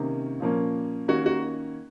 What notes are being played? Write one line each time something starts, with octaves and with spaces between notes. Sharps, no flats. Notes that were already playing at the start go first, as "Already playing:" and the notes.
Already playing: C3 D#3 A#3 C#4
A#2 F3 A#3 C#4
D#3 A#3 C#4 F#4
F#4